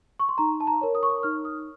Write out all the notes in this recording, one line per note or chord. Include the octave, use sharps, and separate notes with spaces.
C#6
C6
D#4 A#5
A5
A#5
A#4 C#5
D#6
C#6
D#6
D#4 F6
D#6